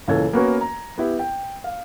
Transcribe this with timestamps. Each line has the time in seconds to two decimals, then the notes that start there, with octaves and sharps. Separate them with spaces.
0.08 C#2 A#2 E3 A4 C#5 G#6
0.33 A#3 B3 C#4 F#4 A#4 B4
0.61 A#5
0.98 B3 E4 G4
1.19 G5
1.64 F5